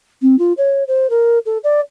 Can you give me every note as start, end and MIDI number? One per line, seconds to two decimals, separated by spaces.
0.22 0.38 60
0.39 0.53 65
0.57 0.84 73
0.88 1.09 72
1.10 1.38 70
1.46 1.58 69
1.64 1.80 74